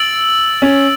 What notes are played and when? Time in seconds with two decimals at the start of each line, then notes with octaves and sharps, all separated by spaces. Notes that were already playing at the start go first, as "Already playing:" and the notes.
Already playing: E6 A6 D7 F#7
0.62 C#4